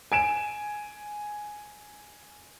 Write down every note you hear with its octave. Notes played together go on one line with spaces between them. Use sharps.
G#5 D7 E7